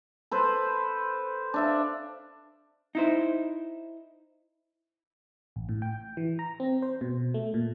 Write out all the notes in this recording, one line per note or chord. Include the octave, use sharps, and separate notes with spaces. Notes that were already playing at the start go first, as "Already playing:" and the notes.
A4 B4 C5
D4 E5 F5
D#4 E4 C5
A1
A2
G5
E3
A#5
C4
C5
B2
A3
A#2